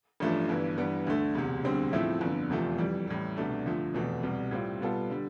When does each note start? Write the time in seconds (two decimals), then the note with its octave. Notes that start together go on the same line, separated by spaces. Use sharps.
0.20 A1 G2 F3 A3 D4
0.49 G1 G2 E3
0.77 G2 E3 G3 B3
1.06 D2 D3 A3
1.35 E1 D2 C3
1.64 E1 D2 D3 G3 C4
1.93 A2 F3 A3 C4 E4
2.21 G1 F2 D3
2.50 F1 E2 C3 F3 A3
2.78 F2 E3 G3
3.07 A1 A2 G3
3.37 C2 B2 A3 D4
3.66 D2 D3 F3 A3
3.94 F1 E2 B2 A3
4.23 C2 B2 G3
4.51 A2 G3 C4 F4
4.81 B2 G3 B3 F4 A4
5.10 D3 G3